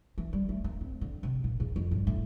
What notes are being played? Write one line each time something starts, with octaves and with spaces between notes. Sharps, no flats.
E3
G3
A3
A#3
C4
D3
C3
A#2
E2
F2
G2
A2